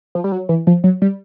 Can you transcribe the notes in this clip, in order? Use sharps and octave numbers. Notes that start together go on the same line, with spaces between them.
F3
G3
F#3
E3
F3
F#3
G3